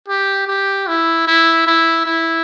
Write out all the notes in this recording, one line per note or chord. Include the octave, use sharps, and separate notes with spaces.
G4
G4
E4
E4
E4
E4